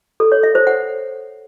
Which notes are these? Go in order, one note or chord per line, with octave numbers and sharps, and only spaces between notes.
A4
C#5
E5
C5
F#5